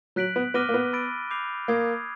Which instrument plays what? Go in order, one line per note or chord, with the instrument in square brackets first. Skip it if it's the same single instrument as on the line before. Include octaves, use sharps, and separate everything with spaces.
[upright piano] F#3 [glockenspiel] F#6 B6 D7 F#7
[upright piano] B3
[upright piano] B3 [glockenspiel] D6 F6 A#6 D#7 G7
[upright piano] A#3
B3
[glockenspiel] B5 E6 A6 D7
B5 D6 G6 C7 F7
[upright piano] A#3 [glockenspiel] D#6 G#6 C7